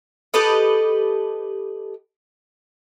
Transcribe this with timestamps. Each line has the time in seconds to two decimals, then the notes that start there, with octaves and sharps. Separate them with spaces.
0.34 G4 A4 B4 D#5